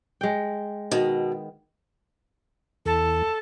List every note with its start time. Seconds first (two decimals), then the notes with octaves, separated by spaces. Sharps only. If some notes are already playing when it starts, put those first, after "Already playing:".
0.21 G#3 G5
0.91 B2 D#3
2.86 E2 A4